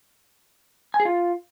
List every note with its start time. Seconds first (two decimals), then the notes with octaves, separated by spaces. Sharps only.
0.94 G#5
1.00 G#4
1.05 F4